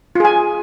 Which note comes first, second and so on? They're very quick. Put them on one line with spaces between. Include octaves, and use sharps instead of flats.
F4 G#4 G#5